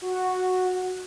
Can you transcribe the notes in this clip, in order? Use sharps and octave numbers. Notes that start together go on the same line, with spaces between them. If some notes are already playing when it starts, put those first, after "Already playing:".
F#4